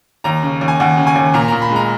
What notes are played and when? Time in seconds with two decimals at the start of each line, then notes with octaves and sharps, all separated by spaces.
0.24 D#2 A#5
0.43 C#3
0.61 D#2
0.68 G#5
0.80 D#2 F#5
0.97 C#3
1.07 G#5
1.16 D#2
1.34 A#2 A#5
1.48 A#2 A#5
1.62 B5
1.70 G#3
1.76 A#5